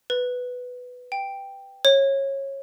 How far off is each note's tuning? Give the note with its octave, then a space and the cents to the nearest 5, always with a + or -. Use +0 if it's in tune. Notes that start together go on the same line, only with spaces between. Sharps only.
B4 +5
G5 +5
C#5 -20